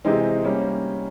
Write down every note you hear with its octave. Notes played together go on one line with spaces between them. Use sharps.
C3 E3 G#3 C4 D#4
G3 A#3 C#4